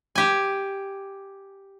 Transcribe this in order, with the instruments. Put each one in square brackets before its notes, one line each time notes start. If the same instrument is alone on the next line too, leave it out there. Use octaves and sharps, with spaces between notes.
[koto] G4 G#5